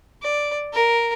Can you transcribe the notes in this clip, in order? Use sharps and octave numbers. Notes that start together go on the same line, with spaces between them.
D5
A#4